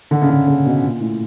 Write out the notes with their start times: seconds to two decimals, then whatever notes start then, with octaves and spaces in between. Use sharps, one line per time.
0.11 D3
0.22 C#3
0.29 D3
0.48 C#3
0.66 B2
0.83 A#2
1.00 A2